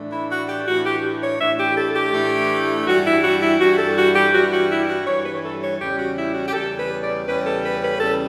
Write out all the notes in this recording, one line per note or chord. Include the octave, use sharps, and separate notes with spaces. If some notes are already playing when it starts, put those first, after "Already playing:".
Already playing: A2 E3 A3 D4
E4
F#4
G4
A2 E3 A3 D4 F#4
G4
C#5
A2 E3 A3 D4 E5
G4
A4
G4
A2 E3 A3 D4
G2 E3 G3 F#4
E4
F#4
E4
G2 E3 G3 F#4
A4
F#4
G4
G2 E3 G3 F#4
F#4
E4
F#4
G2 E3 G3 C#5
B4
A4
C#5
E2 C#3 G3 C#4 G4
F#4
E4
F#4
G4
E2 C#3 G3 C#4 A4
B4
D5
E2 C#3 G3 C#4 B4
A4
B4
B4
E2 C#3 G3 C#4 A4